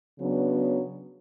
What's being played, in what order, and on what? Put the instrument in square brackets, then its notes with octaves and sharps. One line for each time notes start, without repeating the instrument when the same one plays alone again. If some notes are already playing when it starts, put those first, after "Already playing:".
[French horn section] C#3 F#3 B3 D4